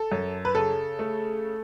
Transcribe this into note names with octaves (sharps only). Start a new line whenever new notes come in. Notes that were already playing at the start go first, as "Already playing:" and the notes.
Already playing: A4
F#2
B4
C#3 A4
A3